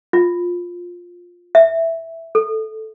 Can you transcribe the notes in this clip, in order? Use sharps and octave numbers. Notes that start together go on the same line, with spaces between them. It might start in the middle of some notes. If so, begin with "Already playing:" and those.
F4
E5
A4